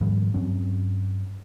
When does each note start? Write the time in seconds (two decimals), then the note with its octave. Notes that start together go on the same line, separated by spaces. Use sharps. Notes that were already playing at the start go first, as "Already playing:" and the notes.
0.01 G#2 D#3 F3 G3
0.34 G2 F#3 C4 C#4